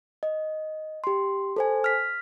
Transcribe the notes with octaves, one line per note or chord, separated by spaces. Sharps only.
D#5
G4 C6
A4 C5 G#5
F6 B6